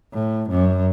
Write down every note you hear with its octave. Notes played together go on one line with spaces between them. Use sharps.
A2
F#2